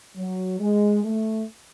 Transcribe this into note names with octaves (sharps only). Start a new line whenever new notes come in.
F#3
G#3
A3